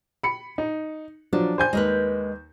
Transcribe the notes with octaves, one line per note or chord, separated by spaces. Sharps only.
B5 C#7
D#4
F3 F#3 D4
C5 G#5 G6
D#2 G#3 A#4 B4